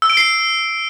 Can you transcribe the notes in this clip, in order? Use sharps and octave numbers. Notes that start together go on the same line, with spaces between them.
E6
D7
C7